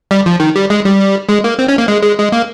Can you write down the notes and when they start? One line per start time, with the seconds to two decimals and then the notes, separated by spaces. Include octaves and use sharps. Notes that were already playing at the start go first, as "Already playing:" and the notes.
0.11 G3
0.26 F3
0.40 D#3
0.56 G3
0.70 G#3
0.85 G3
1.29 G#3
1.44 A#3
1.59 C4
1.68 C#4
1.78 A#3
1.88 G#3
2.03 G#3
2.18 G#3
2.32 A#3